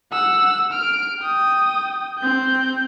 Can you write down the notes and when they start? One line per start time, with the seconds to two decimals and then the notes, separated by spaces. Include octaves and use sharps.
0.12 F#5 E6
0.72 F6 D7
1.20 G5 D#6
2.18 C4 G6